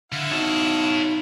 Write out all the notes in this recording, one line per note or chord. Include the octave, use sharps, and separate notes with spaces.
D3 E4 F5 F#5
D#4 F#4 C#5 A5